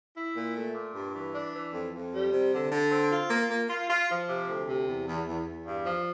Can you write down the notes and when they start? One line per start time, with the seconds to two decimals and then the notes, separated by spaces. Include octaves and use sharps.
0.16 E4
0.37 A#2
0.55 A3
0.75 A#2
0.95 G2
1.14 E3
1.34 D4
1.54 E3
1.73 F2
1.93 F2
2.13 G3
2.32 C3
2.53 D3
2.72 D3
2.91 C4
3.12 F4
3.30 A#3
3.51 A#3
3.70 F4
3.90 F4
4.10 F3
4.29 C3
4.49 D2
4.68 C3
4.87 E2
5.07 E2
5.27 E2
5.47 E2
5.66 G2
5.86 F3